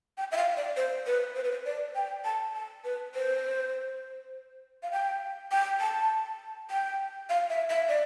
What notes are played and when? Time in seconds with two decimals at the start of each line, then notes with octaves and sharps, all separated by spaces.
0.18 G5
0.32 E5
0.37 F5
0.57 D5
0.77 C5
1.07 B4
1.36 C5
1.44 B4
1.52 C5
1.65 D5
1.95 G5
2.25 A5
2.55 A5
2.85 B4
3.15 C5
4.83 F5
4.92 G5
5.52 G5
5.81 A5
6.71 G5
7.29 F5
7.50 E5
7.70 E5
7.89 D5